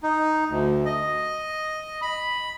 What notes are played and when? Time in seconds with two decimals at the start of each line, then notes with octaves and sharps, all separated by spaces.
0.03 D#4
0.48 D2
0.85 D#5
2.02 B5